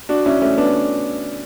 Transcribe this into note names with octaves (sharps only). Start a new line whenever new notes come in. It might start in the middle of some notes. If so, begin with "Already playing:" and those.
D4 F#4
C#4 E4
A3 C#4
B3 D4